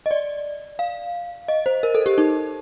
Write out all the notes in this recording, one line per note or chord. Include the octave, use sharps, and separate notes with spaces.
D#5
D5
F5
D#5
C5
A#4
A4
G4
D#4